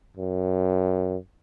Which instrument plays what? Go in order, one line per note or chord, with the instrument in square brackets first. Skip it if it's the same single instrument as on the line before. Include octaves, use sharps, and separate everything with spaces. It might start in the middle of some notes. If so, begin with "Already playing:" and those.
[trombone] F#2